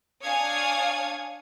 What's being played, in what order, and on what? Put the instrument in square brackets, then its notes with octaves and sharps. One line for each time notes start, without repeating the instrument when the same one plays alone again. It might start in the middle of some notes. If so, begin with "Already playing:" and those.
[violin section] D4 C#5 F5 G#5 D#6 G#6